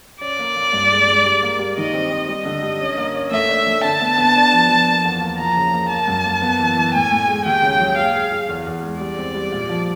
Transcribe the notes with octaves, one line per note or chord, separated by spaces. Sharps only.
C#4 D5
A#3
A#3
G2
G#3
G#3
G3
A#3
G3
D#3 D#5
C4
C4
G3 D#5
D3
G3
C#4
A#3
C#4
A3 E5
D4
A3
D3 A5
B3
B3
D4
F3
F3
A#3
E2
A#3
F3 A#5
C#3
A#3
A#3 A5
F#2
A#3
B3
E3
E3
A2 G#5
A2
G#3
D#2 G5
C#3
F#3
G#4 F5
G#4
G#4
E2
E2
G#3
G3 D5
C4
G3
A#2
F3